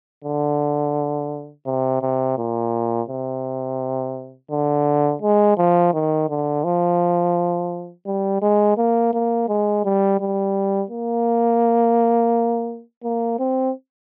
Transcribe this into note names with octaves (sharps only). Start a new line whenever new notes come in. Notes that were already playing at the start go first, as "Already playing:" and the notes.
D3
C3
C3
A#2
C3
D3
G#3
F3
D#3
D3
F3
G3
G#3
A#3
A#3
G#3
G3
G3
A#3
A#3
C4